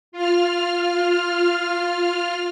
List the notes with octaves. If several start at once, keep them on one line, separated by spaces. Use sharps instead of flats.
F4 F6